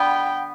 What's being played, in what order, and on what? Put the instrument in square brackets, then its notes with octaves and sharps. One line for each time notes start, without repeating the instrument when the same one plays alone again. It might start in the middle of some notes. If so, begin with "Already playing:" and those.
Already playing: [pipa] D3 G3 B3 [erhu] G5